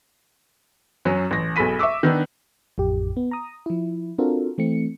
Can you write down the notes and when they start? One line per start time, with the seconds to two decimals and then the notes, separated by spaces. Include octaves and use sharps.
1.05 F#2 F#3 C#4
1.31 A1 A#6
1.56 B1 G#4 A4 B5 B6 D#7
1.79 E5 C#6 D6 E6
2.03 D#3 B3 D4
2.78 A1 F2 G4
3.17 B3
3.31 A#5 D#6
3.66 F3 E4
4.18 C4 D4 F4 F#4 A4 A#4
4.58 E3 A3 C4 C#7